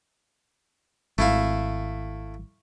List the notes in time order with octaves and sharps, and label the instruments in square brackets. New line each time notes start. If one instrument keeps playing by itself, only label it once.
[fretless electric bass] G#1 [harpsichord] A3 E4 F5